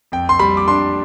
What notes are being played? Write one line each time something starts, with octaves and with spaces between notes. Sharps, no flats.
F2 G5
C6
G3 B5
D6
D4 C6